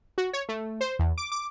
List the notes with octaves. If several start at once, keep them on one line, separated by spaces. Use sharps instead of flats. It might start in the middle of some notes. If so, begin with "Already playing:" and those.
F#4
C#5
A3
C5
E2
D6
D6